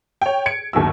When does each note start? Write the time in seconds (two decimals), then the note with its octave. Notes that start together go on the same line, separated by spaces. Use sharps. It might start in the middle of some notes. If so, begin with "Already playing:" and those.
0.22 C#5 G5
0.46 G#6 C#7 D7
0.73 G1 D#2 F#3 E6